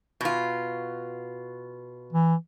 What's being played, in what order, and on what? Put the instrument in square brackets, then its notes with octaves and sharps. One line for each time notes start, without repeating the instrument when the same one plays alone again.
[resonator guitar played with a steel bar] B2 F4
[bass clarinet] E3